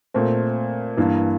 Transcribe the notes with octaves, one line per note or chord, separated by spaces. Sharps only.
A#2 A3 C4
G2 E3 A#3